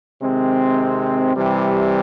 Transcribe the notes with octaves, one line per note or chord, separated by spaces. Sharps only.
C3 D#3 G#3 C4
C3 E3 G3